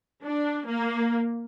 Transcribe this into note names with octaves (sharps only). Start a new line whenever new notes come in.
D4
A#3